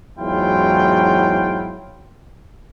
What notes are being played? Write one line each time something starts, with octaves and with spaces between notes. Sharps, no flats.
E2 G#2 F#3 E4 F4 G5